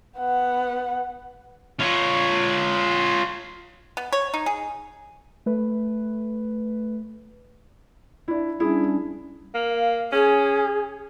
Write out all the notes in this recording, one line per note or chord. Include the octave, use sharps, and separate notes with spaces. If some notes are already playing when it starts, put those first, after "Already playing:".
B3 F#5
F4 C#5
B3
C#5
D#4
G#4
A3 B4
D4 E4
G3 C#4 D4 E4 G#4
A#3
F5
C#4 G#4